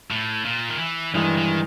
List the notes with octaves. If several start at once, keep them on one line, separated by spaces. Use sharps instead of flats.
A2
A#2
D#3
E3
G2 D#3 E3 G#3
D#3